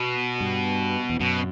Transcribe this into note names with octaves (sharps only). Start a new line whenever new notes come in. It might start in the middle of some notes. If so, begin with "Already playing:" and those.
Already playing: B2
G2
E2
F#2 B2